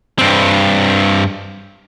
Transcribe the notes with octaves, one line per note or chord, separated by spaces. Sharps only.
G2 C4